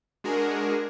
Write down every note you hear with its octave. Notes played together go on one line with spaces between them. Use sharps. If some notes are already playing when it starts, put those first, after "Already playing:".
G#3 D4 F#4 G#4 A#4